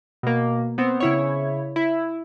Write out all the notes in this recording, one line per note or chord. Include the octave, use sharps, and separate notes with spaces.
B2 A#3
B3 C4
C#3 E4 C#5
E4